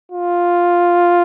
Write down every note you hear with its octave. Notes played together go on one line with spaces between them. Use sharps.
F4